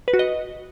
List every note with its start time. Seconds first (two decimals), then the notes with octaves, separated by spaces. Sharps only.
0.08 B4
0.14 F#4
0.19 D#5